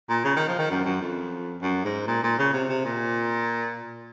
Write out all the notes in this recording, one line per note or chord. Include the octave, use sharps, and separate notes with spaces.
A#2
C#3
D#3
F3
D#3
F#2
F#2
F2
F#2
G#2
A#2
A#2
C#3
C3
C3
A#2